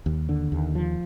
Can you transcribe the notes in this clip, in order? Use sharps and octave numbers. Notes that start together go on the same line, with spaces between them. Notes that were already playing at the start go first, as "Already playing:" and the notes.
D#2
D3
D#2
F3